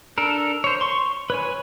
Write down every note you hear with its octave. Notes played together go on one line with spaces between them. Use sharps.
D4 A4 A#4
C5 C#5
C6 C#6
B4 C#5 G#5